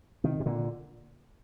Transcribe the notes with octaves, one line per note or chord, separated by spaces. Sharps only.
C3 D#3
C3
A#2 D3